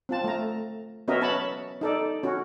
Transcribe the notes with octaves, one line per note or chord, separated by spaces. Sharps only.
C4 F4 A5
A3 A#5
B3 C#4 F#4 A#4 D#5 E5
C#5 A5 B5
D#4 A4 D5
C#4 F#4